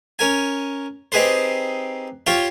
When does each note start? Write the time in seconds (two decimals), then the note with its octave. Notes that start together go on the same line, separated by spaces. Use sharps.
0.19 C#4 A#4 G#5
1.12 C4 D#4 G4 G#4 B4 C5
2.27 F4 G4 C5 C#5 G5